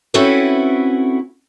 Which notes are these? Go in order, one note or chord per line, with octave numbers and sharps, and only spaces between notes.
C4 C#4 E4 F#4 A4 B4